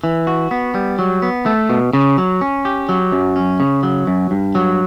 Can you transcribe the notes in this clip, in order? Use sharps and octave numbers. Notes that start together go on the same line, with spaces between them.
E3
F#4
B3
G3
F#3
B3
A3
B2
C#3
F#3
C#4
G4
F#3
F#2
C#4
C#3
F#3
F#2
G2
F#3